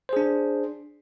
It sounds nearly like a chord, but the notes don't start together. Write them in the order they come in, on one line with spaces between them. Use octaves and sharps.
C5 G#4 D4